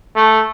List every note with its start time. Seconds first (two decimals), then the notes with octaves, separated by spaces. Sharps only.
0.16 A3